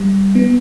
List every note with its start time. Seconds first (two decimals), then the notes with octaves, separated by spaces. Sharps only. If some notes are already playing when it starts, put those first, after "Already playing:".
Already playing: G3
0.35 B3